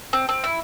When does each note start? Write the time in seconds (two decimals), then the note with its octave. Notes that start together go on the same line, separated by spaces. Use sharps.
0.13 C4
0.29 C4
0.44 E4